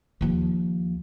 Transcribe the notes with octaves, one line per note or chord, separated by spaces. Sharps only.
D#2 F3